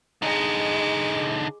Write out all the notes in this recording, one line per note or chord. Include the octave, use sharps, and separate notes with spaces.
D3 G#3 D#4 D6